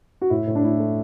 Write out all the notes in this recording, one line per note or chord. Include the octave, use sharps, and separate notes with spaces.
F#4
A2 E4
A2
D4
A3 E4
A3